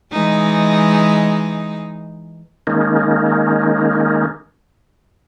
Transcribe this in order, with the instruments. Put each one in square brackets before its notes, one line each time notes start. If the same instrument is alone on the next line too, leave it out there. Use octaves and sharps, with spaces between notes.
[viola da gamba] E3 G#3 D#4
[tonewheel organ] D#3 G#3 A#3 C#4 D#4